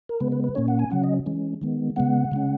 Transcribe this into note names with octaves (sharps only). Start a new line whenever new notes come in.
A#4
C#3 G#3 B3 B4
B4
B4
A#2 A#3 C#4 C#5
F#5
G#5
C#3 F#3 C#4 F#5
D#5
E3 G#3 C#4
D#3 G#3 B3
C#3 G#3 B3 F#5
C#3 G#3 C#4